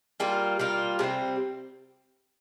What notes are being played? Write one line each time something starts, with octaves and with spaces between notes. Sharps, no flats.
G3 A#3 F4
G3 A#3 F4
C3 G3 C4